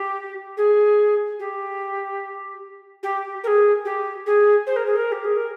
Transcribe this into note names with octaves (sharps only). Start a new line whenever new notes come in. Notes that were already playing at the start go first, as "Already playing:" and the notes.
Already playing: G4
G#4
G4
G4
A#4
G#4
G4
G#4
C5
A#4
G#4
A#4
G4
G#4
A#4